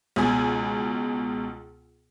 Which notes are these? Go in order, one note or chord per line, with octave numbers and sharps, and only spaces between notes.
C#2 B2 G#5